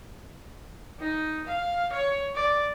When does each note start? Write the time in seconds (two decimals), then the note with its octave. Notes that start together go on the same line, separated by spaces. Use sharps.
1.00 D#4
1.47 F5
1.92 C#5
2.35 D5